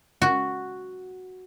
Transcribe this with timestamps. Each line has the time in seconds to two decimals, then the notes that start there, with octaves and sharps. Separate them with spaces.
0.22 F#4